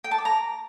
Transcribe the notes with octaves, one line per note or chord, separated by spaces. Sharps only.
G5
A5
D6
A#5